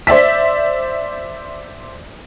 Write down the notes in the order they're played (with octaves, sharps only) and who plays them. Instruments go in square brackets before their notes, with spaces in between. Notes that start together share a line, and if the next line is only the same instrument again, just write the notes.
[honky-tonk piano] C5 D5 E5 B6